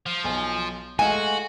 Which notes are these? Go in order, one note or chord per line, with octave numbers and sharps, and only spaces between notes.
F3
B1 G#5
G#3 A3 F#4 F5 G#5